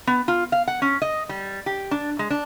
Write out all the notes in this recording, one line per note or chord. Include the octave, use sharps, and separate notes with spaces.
B3
F4
F5
F#5
C#4
D#5
G3
G4
D4
G#3
D4